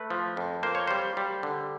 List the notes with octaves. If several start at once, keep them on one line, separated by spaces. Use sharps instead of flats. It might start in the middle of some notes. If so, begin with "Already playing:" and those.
Already playing: A3 B4
F3
F2
A#3 C5
C#5
G3 C5
G3
D3